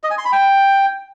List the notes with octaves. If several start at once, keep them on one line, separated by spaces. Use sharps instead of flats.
D#5
G#5
C6
B5
G5